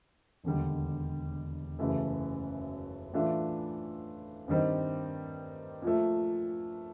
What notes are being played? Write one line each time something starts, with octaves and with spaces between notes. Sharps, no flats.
E1 D#2 D3 G3
F#1 F#2 C#3 E3 A3
A2 E3 A3 D4 F4
G2 D#3 G3 C4 D#4
A#2 F3 A3